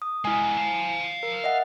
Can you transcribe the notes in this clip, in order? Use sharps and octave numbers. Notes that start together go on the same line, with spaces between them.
D#6
G#3 B3 E4 G#5
F5 A5
A#4
D#5 E5 F#5